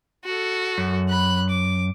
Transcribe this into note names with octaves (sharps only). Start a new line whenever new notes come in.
F#4 A4
F#2
B5 F#6
D6